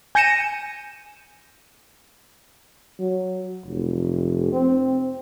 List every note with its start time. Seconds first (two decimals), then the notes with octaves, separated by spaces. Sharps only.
0.15 G#5 G6 A#6 C#7 D#7 E7
3.00 F#3
3.66 F1
4.52 C4